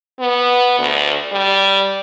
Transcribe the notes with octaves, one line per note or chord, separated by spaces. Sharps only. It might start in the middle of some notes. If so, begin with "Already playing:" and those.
B3
D2
G3